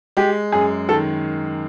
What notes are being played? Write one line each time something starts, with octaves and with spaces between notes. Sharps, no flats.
G#3 G4
F#2 G#4
D#3 A4